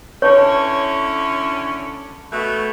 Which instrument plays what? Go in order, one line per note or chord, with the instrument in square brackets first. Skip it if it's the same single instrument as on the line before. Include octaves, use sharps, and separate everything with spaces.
[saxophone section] D3 C#4 E4 [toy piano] C#5 [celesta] A5 C#6
[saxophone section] B2 A3